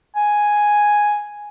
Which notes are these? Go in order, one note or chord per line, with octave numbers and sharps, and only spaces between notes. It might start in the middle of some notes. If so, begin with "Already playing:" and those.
G#5